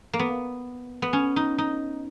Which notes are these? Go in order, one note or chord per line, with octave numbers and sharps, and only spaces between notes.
A#3
B3
B3
C#4
D#4
D#4